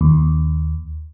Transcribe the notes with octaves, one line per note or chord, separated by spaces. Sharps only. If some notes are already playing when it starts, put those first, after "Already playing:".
D#2